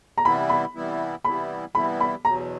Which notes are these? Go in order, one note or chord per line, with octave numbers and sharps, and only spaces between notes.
A#5
C3 E3 G3 B3 E4 B5
B5
C3 E3 G3 B3 E4
C3 E3 G3 B3 E4 B5
C3 E3 G3 B3 E4 B5
B5
E2 B2 F#3 A#5